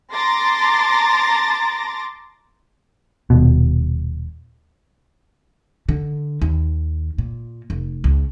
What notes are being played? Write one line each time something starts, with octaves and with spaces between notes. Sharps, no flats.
A5 A#5 C6 D6 A6 A#6
D#1 B2
D3
D#2
A#2
F1
C#2